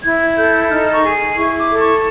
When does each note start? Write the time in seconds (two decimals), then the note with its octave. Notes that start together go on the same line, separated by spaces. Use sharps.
0.04 E4 G#6
0.37 A4 G6
0.70 D#4 F6
0.93 C#6
1.03 G#4
1.36 E4 C#6
1.58 D6
1.69 A4
1.80 C#6